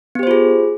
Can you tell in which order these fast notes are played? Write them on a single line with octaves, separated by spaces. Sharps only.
B3 G4 C5 F4 G#4